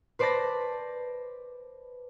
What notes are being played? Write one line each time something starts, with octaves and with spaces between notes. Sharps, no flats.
B4 C5 D5 A5 B5 A#6